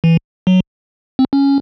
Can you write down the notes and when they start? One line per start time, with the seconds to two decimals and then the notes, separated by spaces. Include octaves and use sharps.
0.04 E3
0.47 F#3
1.19 C4
1.33 C#4